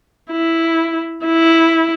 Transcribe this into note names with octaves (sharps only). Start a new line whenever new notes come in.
E4
E4